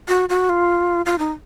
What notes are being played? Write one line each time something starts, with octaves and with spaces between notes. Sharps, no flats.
F#4
F#4
F4
F4
D#4